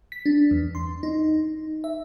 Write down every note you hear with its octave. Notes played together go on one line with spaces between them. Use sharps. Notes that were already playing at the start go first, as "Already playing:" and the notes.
B6
D4
E2
C6
D#4
E5